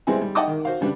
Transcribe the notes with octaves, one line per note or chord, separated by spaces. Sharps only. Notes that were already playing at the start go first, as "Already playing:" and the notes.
G3 G#3 B3 C4 E4 G#4
G3
D#5 F#5 G5 A5 D6 D#6
D#3
F#4 C5 F5
C#3 G3 D4 B4